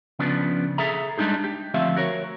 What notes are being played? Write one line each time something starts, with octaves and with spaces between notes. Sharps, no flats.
C#3 F3 B3 D4
G#4 A4 E5 A#5
G3 G#3 D4 D#4 G#4
G4
D2 F3 A3 C4 E5 F5
F#4 A#4 C#5